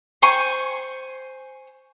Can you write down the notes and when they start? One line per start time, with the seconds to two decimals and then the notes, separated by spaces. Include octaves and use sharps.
0.22 C5 G#5 C#6